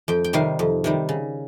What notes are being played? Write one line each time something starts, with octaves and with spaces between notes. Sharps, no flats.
F2 G5
G5
C3 D#3 G3 F5
F2
C3 D#3 G3
C#3